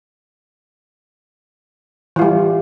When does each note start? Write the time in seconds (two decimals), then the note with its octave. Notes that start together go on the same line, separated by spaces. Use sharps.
2.16 E3
2.19 F4
2.22 G3